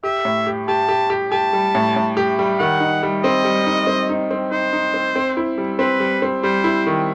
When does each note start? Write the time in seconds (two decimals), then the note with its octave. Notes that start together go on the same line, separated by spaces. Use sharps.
0.03 G4 E5
0.25 A2
0.47 G4
0.68 G4 A5
0.89 G4
1.10 G4
1.31 G4 A5
1.53 G3
1.75 A2
1.96 A2
2.17 G4
2.39 G3
2.59 D#3 F#5
2.80 D#4
3.03 G3
3.23 C4 D#5
3.45 G3
3.66 D#4
3.87 C4
4.09 D#4
4.31 C4
4.51 D#4 C5
4.73 D#4
4.94 C4
5.16 C4
5.37 E4
5.58 G3
5.79 C4 B4
6.00 G3
6.22 C4
6.43 G3 C5
6.64 E4
6.86 D#3